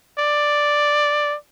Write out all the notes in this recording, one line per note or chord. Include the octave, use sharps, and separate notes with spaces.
D5